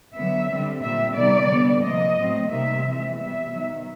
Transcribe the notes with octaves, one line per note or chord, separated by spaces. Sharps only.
D3 F#3 B3 E5
D3 G3 C4
A#2 G3 C4 E5
C3 D#3 G3 B3 D5
D3 G3 B3
C3 F3 A#3 D#5
A2 F#3 A3 C4
C3 D#3 G3 A#3 E5
E3 G#3 C4
B2 G3 B3 E5
D#3 F#3 B3